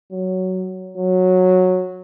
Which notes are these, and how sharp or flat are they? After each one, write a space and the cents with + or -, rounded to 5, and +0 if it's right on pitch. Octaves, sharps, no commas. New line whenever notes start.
F#3 +10
F#3 -10